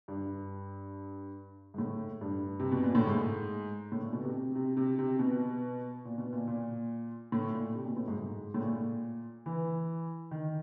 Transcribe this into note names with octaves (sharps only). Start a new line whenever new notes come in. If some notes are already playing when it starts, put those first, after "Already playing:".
G2
G#2
A2
G2
C3
B2
A#2
A2
G#2
A2
A#2
B2
C3
C3
C3
C3
C3
B2
A#2
B2
A#2
A#2
A2
A#2
C3
B2
A2
G#2
G#2
A2
A#2
E3
D#3